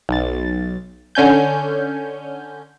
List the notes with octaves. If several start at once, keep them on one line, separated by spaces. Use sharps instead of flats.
B1 A6
D3 C#4 G#5 G6